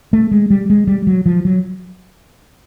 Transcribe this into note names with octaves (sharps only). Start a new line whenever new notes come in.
A3
G#3
G3
G#3
G3
F#3
F3
F#3